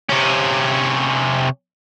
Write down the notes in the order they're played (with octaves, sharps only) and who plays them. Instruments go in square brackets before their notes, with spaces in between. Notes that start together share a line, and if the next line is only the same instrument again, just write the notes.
[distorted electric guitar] C3 C#4